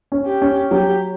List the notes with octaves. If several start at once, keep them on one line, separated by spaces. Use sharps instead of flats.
C#4
G4
C#4
F#3 G4